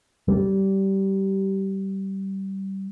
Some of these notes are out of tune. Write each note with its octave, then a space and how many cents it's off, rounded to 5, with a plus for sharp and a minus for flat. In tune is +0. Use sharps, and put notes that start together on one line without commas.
G3 -20